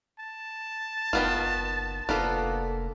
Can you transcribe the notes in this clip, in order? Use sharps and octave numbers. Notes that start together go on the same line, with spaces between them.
A5
F#1 D#3 B3 F4
F1 A#3 B3 D4 F4 A4